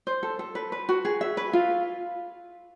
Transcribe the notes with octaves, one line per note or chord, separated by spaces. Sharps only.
C5
A4
A4
B4
B4
F#4
G#4
E5
B4
F4